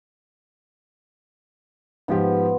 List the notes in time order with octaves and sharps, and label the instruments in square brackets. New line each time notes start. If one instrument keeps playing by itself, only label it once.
[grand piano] G#2 F3 G4 [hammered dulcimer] B3 F4